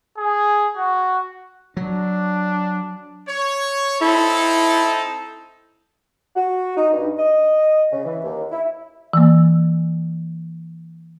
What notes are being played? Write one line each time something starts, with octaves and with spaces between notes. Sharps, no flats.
G#4
F#4
F#3 D4
C#5
C4 D#4 E4 A4
F#4
D#4
G2
D#5
C#3
E3
D#2
E4
E3 A#3